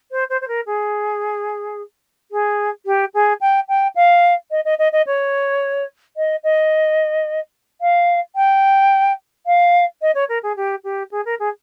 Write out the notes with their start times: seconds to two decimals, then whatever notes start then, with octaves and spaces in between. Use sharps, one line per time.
0.11 C5
0.30 C5
0.41 C5
0.48 A#4
0.66 G#4
2.31 G#4
2.86 G4
3.14 G#4
3.41 G5
3.68 G5
3.95 F5
4.51 D#5
4.65 D#5
4.79 D#5
4.92 D#5
5.06 C#5
6.17 D#5
6.43 D#5
7.81 F5
8.36 G5
9.46 F5
10.01 D#5
10.15 C#5
10.29 A#4
10.43 G#4
10.56 G4
10.84 G4
11.11 G#4
11.25 A#4
11.39 G#4